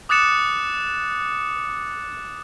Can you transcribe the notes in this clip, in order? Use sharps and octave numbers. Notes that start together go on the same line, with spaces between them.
D6 D#6 F#6 A6 C#7 E7